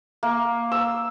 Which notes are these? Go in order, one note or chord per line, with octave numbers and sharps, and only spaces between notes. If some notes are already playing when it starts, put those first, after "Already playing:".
A#3
E6